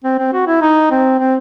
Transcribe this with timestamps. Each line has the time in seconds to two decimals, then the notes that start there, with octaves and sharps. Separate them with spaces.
0.04 C4
0.19 C4
0.34 F#4
0.47 E4
0.62 D#4
0.91 C4
1.20 C4